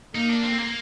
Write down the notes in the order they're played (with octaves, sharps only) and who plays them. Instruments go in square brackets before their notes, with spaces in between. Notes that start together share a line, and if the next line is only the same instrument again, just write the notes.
[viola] A#3 [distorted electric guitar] D#4
[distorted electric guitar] D4
C4
A#3